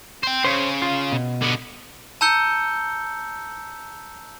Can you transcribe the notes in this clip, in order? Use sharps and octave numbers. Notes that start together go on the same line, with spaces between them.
C5 G5
C#3 C5 C#5
F4
B2
D3 B3
A5 A#5 E6 G6 C#7 G7